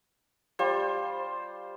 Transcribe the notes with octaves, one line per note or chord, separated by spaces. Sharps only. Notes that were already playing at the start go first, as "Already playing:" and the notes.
G3 F4 C5